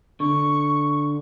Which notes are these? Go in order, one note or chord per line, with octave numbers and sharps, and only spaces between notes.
D3 C#6